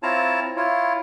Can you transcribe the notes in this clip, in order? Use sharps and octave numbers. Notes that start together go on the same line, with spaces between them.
C4 E4 F4 C#5 A5 A#5
E4 F4 C#5